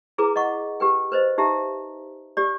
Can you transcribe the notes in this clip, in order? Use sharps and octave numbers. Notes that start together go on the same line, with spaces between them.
E4 G#4 B4 A#5 D6
D#5 F#5 C#6
G4 B4 G5
B4 C5 D#5
D#4 G4 E5 A#5
G4 D5